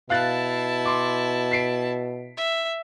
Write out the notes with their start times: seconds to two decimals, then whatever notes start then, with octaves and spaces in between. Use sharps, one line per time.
0.10 B2 E4 F5 A5 F#6 A6
0.86 C6 D6
1.51 B6 C7 D7
2.37 E5